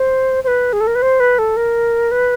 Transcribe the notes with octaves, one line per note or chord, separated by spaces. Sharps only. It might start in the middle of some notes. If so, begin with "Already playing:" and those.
Already playing: C5
C5
B4
G#4
A4
A#4
B4
C5
B4
A4
A#4
B4